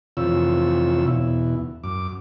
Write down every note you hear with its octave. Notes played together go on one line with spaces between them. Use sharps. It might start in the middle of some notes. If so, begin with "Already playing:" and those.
F2 C3 E3 F4 C#5 E6
E2 B2 E4
F#2 D6